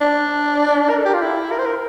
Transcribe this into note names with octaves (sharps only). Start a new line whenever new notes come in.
D4
A#4
A4
G4
F4
E4
A#4
C5
A#4